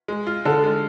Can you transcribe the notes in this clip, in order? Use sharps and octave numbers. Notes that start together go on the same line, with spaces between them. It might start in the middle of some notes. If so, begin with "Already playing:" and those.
G#3
F4
D3 A4
G#3